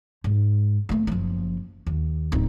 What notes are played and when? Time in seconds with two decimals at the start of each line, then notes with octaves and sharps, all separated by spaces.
0.24 G#2
0.89 A3 A#3
1.07 F#1 F3
1.87 D#2
2.32 D1 D#4